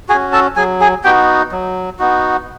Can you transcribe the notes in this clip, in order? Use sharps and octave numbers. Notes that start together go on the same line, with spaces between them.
C#4 F#4 G#4 G#5
A4 A5
F#3 G#4 G#5
G#4 G#5
B3 D#4 F#4 G4 G5
F#3
B3 D#4 F#4